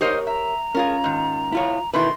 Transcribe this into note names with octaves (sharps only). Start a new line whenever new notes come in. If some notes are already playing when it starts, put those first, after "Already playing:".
D#4 G4 A#4 C5 C#5 D#5
E5 A#5
C#4 F4 G#4 A#4
G#2 D#3
E4 F4 C#5
B2 D#3 A3 E4 B4 C6